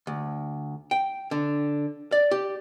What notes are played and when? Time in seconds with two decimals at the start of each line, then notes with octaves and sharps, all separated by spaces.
0.07 D2
0.91 G5
1.31 D3
2.12 D5
2.31 G4